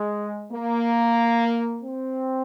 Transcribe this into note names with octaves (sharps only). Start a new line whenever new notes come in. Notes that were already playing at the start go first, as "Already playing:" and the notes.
Already playing: G#3
A#3
C4